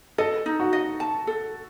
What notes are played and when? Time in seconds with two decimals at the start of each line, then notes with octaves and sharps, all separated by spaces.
0.18 A4 D#5
0.46 D#4
0.60 F#4
0.73 D#5
1.00 A5
1.27 A4